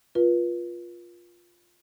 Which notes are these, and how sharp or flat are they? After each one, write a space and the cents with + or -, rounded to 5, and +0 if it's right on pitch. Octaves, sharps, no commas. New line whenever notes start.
F4 +0 B4 -40